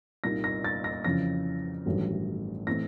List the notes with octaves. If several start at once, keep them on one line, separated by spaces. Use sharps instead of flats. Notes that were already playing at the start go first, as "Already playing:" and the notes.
C2 A#2 G3 A#3 D#4 A#6
A#6
A6
A#6
F2 C#3 E3 A#6
A1 G2 D#3 F#3 A3
A2 E3 A3 C4 A#6